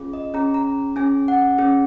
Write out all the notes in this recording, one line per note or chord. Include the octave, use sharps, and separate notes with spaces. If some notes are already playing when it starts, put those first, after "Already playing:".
Already playing: C#4 F4 G#4
D#5
C#4 G#4 A#5
A#5
C#4 G#4 G#5
F#5
C#4 G#4